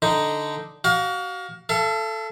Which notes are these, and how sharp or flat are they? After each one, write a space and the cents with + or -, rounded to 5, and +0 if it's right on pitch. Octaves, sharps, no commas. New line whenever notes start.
D3 +0 D#4 +0
F#4 +30 F5 +30
A4 +0 F5 -45